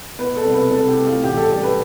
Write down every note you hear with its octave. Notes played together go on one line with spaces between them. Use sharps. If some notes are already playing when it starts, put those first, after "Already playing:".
B2 B4
A4
C2
B4
C3 A4
G4
A3
F4
A1 G4
A4
G3 A4
B4